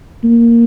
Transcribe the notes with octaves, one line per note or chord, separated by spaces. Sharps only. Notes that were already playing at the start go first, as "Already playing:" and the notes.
A#3